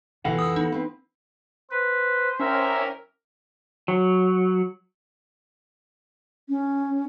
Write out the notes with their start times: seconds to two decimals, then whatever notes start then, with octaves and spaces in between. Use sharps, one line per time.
0.25 B2 E3 F3 A4 F5 F#5
0.38 F2 D#6 E6
0.56 B3 D#4
0.72 C4 B4
1.71 B4 C5
2.40 C2 C#4 G4 A#4 E5
3.88 F#3
6.49 C#4